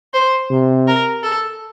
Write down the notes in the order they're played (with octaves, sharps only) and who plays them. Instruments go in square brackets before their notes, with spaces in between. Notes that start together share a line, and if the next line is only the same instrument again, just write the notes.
[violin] C5
[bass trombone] C3
[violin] A#4
A4